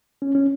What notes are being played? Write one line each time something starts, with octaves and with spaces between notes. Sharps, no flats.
C#4
C#4